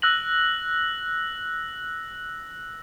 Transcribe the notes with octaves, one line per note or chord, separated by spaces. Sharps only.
E6 F#6 A#6 F#7